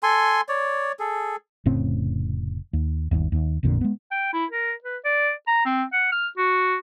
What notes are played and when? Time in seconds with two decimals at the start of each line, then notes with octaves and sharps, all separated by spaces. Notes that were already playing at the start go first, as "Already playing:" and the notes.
0.03 A4 G#5 C6
0.49 C#5 D5
0.99 G#4 A4
1.66 F1 A2 C#3 C4
2.73 D#2
3.11 G1 D#2
3.32 D#2
3.63 A1 F2 A#2 D3
3.81 G#3 B3
4.11 G5
4.33 E4
4.51 A#4
4.84 B4
5.05 D5
5.47 A#5
5.65 C4
5.93 F#5
6.12 F6
6.37 F#4